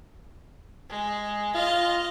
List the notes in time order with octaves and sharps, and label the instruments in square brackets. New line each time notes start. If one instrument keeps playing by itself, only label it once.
[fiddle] G#3
[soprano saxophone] F4 [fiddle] D#5 F6